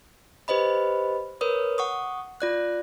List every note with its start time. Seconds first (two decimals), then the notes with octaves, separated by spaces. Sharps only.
0.48 G4 B4 C5 D#5 B5
1.41 A#4 B4 C#5 D#6
1.78 F#5 C#6 D#6
2.40 F4 D5 F#6